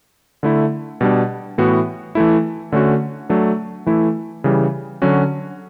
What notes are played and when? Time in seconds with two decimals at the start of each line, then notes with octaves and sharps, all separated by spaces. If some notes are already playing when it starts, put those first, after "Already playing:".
0.43 D3 A3 E4
1.01 B2 G3 D4
1.58 A2 E3 B3 F#4
2.15 E3 A3 E4
2.72 D3 A3 C#4 F#4
3.29 F#3 A3 D4
3.86 E3 A3 E4
4.44 C#3 E3 G3
5.02 D3 F#3 C#4 F#4